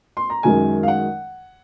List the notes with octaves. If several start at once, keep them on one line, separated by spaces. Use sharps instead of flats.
C6
A#5
F#2 D#3 G#3 G#5
F5
F#5